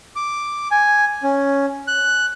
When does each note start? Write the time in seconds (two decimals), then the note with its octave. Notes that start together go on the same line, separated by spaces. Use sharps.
0.16 D6
0.71 G#5
1.23 C#4
1.87 F#6